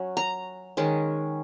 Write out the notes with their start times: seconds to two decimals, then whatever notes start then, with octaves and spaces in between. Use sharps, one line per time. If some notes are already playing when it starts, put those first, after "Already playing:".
Already playing: F#3 C#4
0.17 A#5
0.77 D#3 G#3 C#4